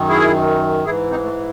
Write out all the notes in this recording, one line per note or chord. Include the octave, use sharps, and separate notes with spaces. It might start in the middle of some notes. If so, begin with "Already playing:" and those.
Already playing: F#2 D#3
E4 G#4
G#2 E3 E4 G#4
C4 D#4
A3